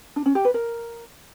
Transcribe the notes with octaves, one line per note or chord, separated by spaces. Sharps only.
D4
C#4
G4
B4
A#4